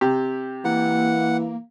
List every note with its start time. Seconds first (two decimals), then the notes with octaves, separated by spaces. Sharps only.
0.01 C3 G4
0.65 E3 A#3 F#5